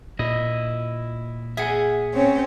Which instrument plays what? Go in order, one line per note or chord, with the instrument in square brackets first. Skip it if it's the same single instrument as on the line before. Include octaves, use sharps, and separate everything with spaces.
[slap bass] A#2 [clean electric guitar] E4 D#5
[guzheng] G#4 [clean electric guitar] E5 F#5 G#5
[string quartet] C4 C#4 C#5